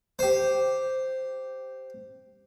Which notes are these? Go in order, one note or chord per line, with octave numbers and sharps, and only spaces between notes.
G4 C5